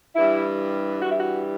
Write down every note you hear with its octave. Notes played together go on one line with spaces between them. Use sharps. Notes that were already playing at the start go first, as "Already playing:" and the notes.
G2 E3 G3 E4
G2 E3 G3 F#4
E4
F#4